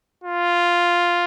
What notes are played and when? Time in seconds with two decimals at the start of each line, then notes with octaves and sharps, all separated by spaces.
0.24 F4